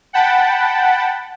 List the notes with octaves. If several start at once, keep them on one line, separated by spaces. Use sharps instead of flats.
F#5 G5 A5 B5